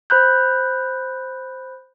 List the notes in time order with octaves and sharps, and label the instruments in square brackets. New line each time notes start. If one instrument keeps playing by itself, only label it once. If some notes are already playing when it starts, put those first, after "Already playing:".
[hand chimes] C5 B5 F#6 G6